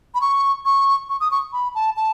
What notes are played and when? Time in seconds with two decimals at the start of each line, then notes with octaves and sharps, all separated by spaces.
0.15 B5
0.21 C#6
0.65 C#6
1.09 C#6
1.20 D#6
1.31 C#6
1.53 B5
1.75 A5
1.97 A5